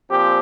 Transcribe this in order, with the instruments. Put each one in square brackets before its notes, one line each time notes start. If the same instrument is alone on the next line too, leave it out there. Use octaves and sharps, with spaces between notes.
[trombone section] A#2 F3 C4 G4